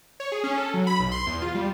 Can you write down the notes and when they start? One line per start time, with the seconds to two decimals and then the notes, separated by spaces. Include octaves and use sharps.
0.20 C#5
0.32 G#4
0.44 C#4
0.57 A4
0.74 F#3
0.87 B5
1.00 B1
1.12 C6
1.26 E2
1.42 F4
1.55 G3